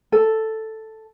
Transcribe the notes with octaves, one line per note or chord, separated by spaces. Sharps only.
A4